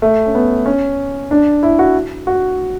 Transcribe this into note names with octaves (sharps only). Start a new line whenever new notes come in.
A3
C#4
B3
C#4
D4
E4
F#4
F#4